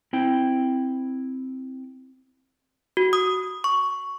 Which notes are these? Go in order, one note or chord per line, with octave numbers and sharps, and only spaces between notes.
C4 E4 G5
F#4
D#6
C#6